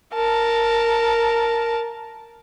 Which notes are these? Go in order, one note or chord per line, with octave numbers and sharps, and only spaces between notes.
A#4 A5